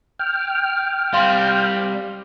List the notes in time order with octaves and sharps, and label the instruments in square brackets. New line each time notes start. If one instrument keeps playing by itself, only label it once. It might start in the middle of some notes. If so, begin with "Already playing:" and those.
[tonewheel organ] G5 F6
[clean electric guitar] G3 C4 [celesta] F5 C6